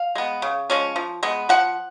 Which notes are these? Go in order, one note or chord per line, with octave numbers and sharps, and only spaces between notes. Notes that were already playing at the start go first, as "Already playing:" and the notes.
Already playing: F5
G#3 B3
C#3
F3 G#3 C#4
F3
G#3 B3
F3 F#5